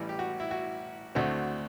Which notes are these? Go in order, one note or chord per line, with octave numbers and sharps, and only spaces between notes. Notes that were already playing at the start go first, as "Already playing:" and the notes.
Already playing: A1 A2 E3 G3 E4
G4
F#4
E4
F#4
D2 D3 A3 C4 F#4